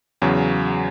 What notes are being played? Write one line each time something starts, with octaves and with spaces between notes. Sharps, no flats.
E2 C#3 F#3